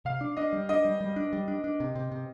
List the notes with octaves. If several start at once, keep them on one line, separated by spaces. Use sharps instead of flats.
C3 F5
D4
D4 D#5
G3
D4 D#5
G3
G3
D4
G3
D4
D4
C3
C3
C3